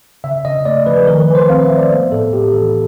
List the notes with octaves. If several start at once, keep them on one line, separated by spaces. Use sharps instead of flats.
C#3 E5
C#3 D#5
A3 D5
F3 B4
D#3 A#4
B4
D#3
C5
C4 F5
E5
G#3
D5
B3
A2 A4
G#3 G4
E3 A4